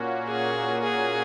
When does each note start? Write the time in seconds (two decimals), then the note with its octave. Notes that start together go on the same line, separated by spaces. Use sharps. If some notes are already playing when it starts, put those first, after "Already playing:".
Already playing: A#2 A#3 C#4 F#4
0.28 G#4
0.84 G#4